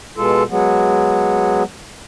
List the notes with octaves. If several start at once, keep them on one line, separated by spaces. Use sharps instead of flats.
B2 G#3 F4 A4
F#3 G#3 B3